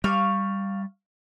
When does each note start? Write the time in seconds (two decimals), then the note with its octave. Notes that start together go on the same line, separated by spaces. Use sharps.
0.04 G3 F5 C#6